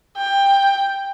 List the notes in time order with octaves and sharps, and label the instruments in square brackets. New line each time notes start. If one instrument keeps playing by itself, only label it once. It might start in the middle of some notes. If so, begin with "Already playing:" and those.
[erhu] G5